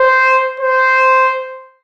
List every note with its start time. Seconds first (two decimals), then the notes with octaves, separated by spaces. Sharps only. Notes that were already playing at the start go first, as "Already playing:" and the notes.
Already playing: C5
0.60 C5